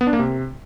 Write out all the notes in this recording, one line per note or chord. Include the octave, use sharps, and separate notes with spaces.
B3
D4
A#3
C3